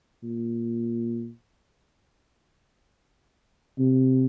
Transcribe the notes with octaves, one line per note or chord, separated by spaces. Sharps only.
A#2
C3